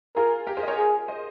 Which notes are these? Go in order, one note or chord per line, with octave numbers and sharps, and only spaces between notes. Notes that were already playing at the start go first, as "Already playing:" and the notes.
F4 G#4 A#4
G4 A#4
G#4 C5
D#5
A#4 C#5
G#4
C5 D#5